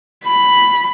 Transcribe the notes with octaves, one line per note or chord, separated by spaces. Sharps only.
B5